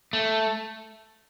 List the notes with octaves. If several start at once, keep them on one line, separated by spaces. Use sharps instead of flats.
A3